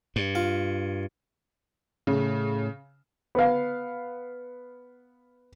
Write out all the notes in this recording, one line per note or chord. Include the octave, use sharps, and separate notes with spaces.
G2
F4
A2 C#3
B3 F5